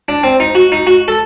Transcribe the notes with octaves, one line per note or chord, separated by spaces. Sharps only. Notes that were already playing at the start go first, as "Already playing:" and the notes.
D4
C4
D#4
F#4
D#4
F#4
A4